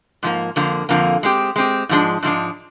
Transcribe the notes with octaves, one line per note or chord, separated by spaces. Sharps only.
G#2 F3 A#3
F2 D3 F3 A#3
F2 D3 F3 A#3
G#3 C4 G4
G#3 C4 G4
G#2 F3 G#3 D4
G#2 F3 G#3 D4